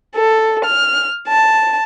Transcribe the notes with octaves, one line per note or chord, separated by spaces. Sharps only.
A4
F6
A5